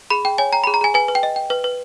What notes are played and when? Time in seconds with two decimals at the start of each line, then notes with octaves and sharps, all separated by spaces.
0.10 G#4 B5
0.25 G#4 G5
0.38 C#5 G#5
0.53 G5 A#5
0.64 G#4 B5
0.74 A#5
0.81 G#4 G#5
0.94 B4 G#5
1.08 B4
1.15 G5
1.23 D#5
1.36 G5
1.50 B4
1.64 B4